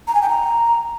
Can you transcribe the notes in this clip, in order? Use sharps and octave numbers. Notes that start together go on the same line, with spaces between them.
A#5
G#5
G5
A#5